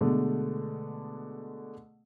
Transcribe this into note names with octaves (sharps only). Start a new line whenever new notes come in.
B2 D3 G#3 A3